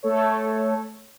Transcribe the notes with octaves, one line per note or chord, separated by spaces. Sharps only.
A3 A4 C#5